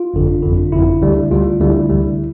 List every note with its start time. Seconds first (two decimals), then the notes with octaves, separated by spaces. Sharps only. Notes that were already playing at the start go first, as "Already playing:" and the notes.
Already playing: F4
0.14 G1 F2 D3
0.43 G1 F2 D3
0.72 G1 F2 D3 E4
1.01 D2 D3 G3
1.31 D2 D3 G3 F4
1.61 D2 D3 G3 E4
1.89 D2 D3 G3